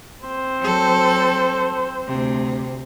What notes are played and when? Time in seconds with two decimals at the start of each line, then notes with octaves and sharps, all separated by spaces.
0.25 C4 C5
0.60 F#3 A4
2.08 D2 C3